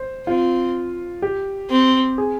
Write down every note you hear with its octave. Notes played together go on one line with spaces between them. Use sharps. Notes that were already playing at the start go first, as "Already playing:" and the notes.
Already playing: C5
C4 F4
G4
C4
G#4